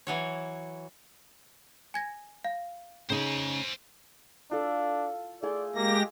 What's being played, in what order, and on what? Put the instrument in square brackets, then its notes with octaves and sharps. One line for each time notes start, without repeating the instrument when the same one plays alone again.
[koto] E3 F#3 C#5
[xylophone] G#5 G#6 A#6
F5
[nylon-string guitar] C#3 D#4 [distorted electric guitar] C5 G#5
[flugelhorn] D4 [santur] F4 A4
[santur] A3 G#4 C6 [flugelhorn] D5
[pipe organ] G#3 G4 A#6 [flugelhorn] A#3